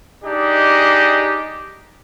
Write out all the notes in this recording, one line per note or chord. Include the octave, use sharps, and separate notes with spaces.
D4 D#4 G4 G#4 D#5